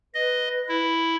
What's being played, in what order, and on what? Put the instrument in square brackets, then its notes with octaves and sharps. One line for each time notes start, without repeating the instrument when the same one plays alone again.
[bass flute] B4 [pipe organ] D#5
[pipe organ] E4